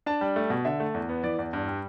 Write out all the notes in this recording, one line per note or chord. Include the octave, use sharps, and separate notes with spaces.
D4 A5
G3
A3
B2
D3 E5
A3
E2
B3
E3 D5
E2
G2
G3